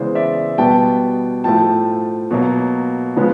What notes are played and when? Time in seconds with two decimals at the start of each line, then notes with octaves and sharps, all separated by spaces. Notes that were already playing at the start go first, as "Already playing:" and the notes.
Already playing: C#3 E3 G#3 B3 C5 D5
0.15 D5 E5
0.58 B2 G3 B3 G5 A5
1.44 A2 F3 A3 G5 A5
2.31 B2 F#3 A#3
3.16 C#3 F3 G#3 B3